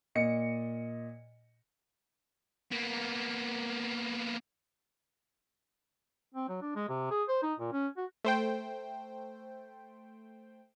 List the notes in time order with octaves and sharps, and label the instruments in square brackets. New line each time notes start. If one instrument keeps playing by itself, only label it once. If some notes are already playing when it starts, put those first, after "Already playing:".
[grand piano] A#2 D#5 C#7
[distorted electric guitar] A#3 B3
[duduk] C4
F#3
D4
G#3
C3
G#4
C5
D#4
A#2
C#4
F#4
[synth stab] A3 C5 G5